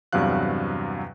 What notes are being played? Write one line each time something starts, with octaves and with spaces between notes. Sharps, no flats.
E2 G2 C3 F#3 F5 F#6